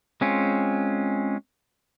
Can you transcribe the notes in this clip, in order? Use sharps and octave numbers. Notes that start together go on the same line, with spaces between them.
G#3 C4 C#4 F4